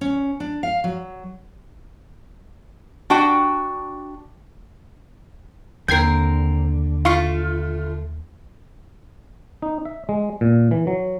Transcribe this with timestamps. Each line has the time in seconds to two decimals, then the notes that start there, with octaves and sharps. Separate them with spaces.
0.01 C#4
0.40 D4
0.63 F5
0.84 F#3
3.10 D4 F#4 G5
5.88 D#2 D3 C4 A#4 G5 G#6 C7
7.05 A3 F4 F5 C6 C#6
9.62 D#4
9.85 E5
10.09 G#3
10.41 A#2
10.71 E3
10.87 F#3